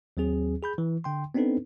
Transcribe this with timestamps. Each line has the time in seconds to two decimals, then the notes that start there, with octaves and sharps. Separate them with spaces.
0.17 D#2 F#3 C4 G#4
0.62 G#4 B5 G6
0.78 E3
1.04 D3 G5 C6
1.34 B3 C4 D4 D#4 A4 B4